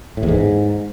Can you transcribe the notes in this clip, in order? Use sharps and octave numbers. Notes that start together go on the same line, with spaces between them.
A2
E2
G#2